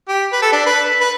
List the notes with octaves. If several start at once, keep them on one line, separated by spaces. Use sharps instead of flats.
G4
B4
A4
D4
B4
B4